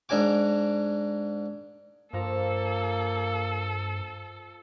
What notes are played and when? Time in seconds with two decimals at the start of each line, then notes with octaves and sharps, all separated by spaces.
0.09 G#2 D4 A#4 G#5 D6
2.13 G2 F3 A#3 A4 A#5 D6